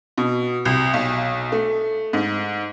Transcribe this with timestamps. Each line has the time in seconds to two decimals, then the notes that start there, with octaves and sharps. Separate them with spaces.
0.17 B2
0.65 C2
0.93 B1
1.52 A3
2.13 G#2